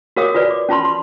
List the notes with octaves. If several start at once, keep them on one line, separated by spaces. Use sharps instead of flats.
F#4 A#4 C#5 F5 D6 D#6
F4 F#4 B4 D5
D6
C#4 F4 A5 B5 C6
C6